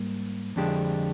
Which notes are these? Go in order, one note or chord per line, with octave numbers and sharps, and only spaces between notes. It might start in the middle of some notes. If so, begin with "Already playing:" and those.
Already playing: G#2 G3 A#3
F2 D3 G#3 D4 G4